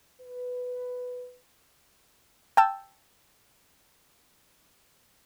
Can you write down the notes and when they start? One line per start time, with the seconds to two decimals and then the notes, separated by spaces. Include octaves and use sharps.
0.20 B4
2.57 G5 A5 E6